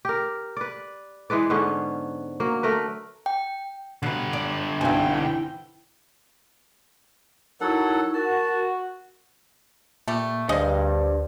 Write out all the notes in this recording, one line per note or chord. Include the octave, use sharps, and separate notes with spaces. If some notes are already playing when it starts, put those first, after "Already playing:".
G4 A#4
B4 D5
E3 G#3 B4 D5
G#2 D3 B3 C#4
F#3 A#3
A3 A#4 B4
G5
B2 D3 B4
D5
B1 G2 E3 C4 G5 G#5
F#3 D#4 E4 A4 A#4 C#5 F#5
F#4 A#4 A5
A#2 G3 A3
D2 G2 G#4 C5 D5 D#5 F5